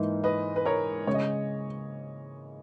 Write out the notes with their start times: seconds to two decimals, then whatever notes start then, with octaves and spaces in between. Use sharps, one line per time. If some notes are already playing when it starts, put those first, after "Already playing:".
Already playing: G#2 E3 A#3 D#4
0.24 B4 D#5
0.56 B4
0.65 A#4 C#5
1.07 C#3 G#3 C#5
1.14 D#5